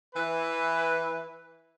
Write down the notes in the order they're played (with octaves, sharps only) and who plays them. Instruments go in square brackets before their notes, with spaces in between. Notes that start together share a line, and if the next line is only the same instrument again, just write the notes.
[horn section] E3 B4